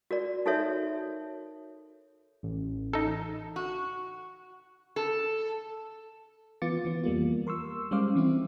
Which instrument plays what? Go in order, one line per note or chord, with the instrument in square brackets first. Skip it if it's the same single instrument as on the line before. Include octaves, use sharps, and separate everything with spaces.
[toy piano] F#4 A#4 D5
D#4 F#4 A4 A#4 C#5 E5
[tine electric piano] A1
[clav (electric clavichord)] D#4 A4
[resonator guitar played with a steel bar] F#4
A4
[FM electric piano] E3 B3 F4 D6 A6 C#7
E3 B3
F2 G3 A#3 F4
A#4 C6 C#6 E6
G3 G#3 C#4 C5 F5 D6
E3 C4 E4